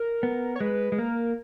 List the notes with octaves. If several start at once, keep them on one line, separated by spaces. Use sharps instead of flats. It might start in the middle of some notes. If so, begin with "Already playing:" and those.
Already playing: A#4
B3
C#5
G#3 B4
G#3
A#3 A#4